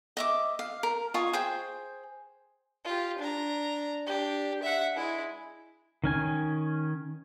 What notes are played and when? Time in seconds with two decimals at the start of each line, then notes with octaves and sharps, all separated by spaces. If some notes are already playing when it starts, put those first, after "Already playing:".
0.17 D#5 E5 D6
0.59 F5
0.83 A#4
1.14 F4 D#5 G#5 C#6
1.33 G#4 C5 G5
2.85 F4 G4
3.19 D4 A#5
4.07 D4 G4
4.63 E5 F#5
4.96 G#3 E4
6.04 D#3 C#4 G#5